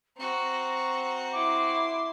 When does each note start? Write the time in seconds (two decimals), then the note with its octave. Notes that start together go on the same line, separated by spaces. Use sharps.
0.17 C4 F#4 A#5
1.33 E4 C6 D6